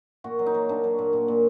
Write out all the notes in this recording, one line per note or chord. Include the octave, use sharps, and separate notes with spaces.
A#2 F#4
F#3
D#4
F#3
A#2 D4
F#3
A#2
A#2
A#2